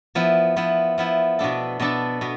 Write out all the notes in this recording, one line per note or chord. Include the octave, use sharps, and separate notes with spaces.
F3 B3 E4
F3 B3 E4
F3 B3 E4
B2 B3 D4 A4
B2 B3 D4 A4
B2 B3